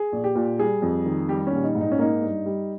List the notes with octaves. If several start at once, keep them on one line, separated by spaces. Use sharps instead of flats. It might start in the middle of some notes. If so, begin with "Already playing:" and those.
Already playing: G#4
A#1
G4
A#2
G3 G#4
F2
D#3
G3 G4
A#1 C#4
D#4
G#2
D#4
C#4
A#3 D#4
G2
G3